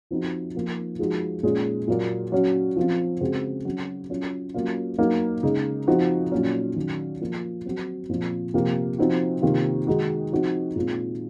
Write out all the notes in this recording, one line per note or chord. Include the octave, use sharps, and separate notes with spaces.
F3 C4 D#4 F#4
F3 A#3 F4
F3 G#3 D#4 F#4
A#2 G#3 C#4
A#2 F#3 A#3
F#3 C#4 F#4
F3 C4 F4
C#3 G#3 C4 F#4
F#3 C#4 F#4
F#3 C#4 F4
F#3 A#3 C#4 F4
F#3 A#3 D#4 F#4
C#3 G#3 D#4
F3 C4 D#4 F#4
A#2 F#3 C#4
D#3 F#3 C#4 F#4
F3 A#3 F4
F#3 C4 F#4
A#2 F3 C4 F4
C3 F3 A#3
F3 C4 D#4 F#4
C3 D#3 A#3 F4
D#3 G#3 D#4 F#4
F3 C4 D#4 F#4
A#2 G#3 C4 F4